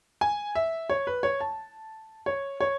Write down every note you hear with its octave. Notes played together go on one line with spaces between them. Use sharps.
G#5
E5
C#5
B4
C#5
A5
C#5
C#5